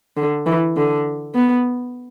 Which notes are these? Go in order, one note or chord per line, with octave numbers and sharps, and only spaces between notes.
D3
E3
D3
B3